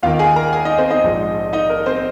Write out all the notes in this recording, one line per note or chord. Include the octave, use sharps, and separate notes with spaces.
D#2 D#3 A#3 F4 F5
G#4 G#5
A#4 A#5
G#4 G#5
D#4 D#5
C4 C5
D#4 D#5
A#1 G#2 F3 G#3
D#4 D#5
A#4
C4 C5